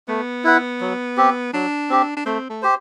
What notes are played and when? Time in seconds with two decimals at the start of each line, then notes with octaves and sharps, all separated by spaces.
0.08 A3 B3
0.44 E4 B4 F#5
0.81 F#3
1.17 C4 G4
1.53 F#3 D4
1.90 C4 G4
2.17 D4
2.25 A3 C4
2.50 A3
2.62 G4 C5